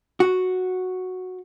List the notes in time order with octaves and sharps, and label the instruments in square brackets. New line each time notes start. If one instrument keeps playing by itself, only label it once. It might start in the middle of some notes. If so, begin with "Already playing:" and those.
[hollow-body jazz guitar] F#4